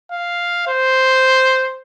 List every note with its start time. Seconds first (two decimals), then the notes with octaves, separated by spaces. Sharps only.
0.12 F5
0.67 C5